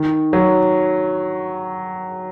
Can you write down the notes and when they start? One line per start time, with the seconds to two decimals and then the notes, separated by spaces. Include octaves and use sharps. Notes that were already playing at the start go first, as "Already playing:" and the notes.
Already playing: D#3
0.33 F#3